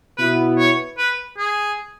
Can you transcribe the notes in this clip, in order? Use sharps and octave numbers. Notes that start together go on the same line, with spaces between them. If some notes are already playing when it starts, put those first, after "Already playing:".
B2 B3 E4 B4
C#5
B4
G#4